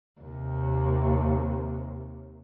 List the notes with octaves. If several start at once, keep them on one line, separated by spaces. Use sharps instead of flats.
D#2 C3